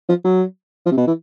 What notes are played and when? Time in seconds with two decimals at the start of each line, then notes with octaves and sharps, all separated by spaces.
0.09 F3
0.24 F#3
0.86 F3
0.91 C3
0.97 B2
1.07 E3